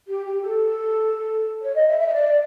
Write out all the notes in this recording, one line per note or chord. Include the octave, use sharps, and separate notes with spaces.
G4
G4
A4
C#5
D#5
E5
E5
D#5
D5